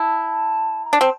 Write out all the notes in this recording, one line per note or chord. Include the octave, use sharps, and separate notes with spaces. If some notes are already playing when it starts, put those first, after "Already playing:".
Already playing: E4 A5
A#5
D4 A5
C4